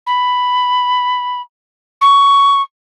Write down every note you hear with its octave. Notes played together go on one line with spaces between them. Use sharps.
B5
C#6